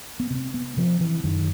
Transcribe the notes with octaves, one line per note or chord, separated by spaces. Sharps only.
B3
C3 C4
B3
C3 F3
E3
F#2 D#3